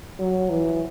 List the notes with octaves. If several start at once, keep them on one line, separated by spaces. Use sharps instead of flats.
F#3
E3